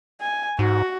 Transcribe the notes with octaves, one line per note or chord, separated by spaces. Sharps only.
G#5
G#2 F#4